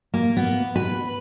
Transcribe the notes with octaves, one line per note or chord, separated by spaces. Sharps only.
A#3
B3
B4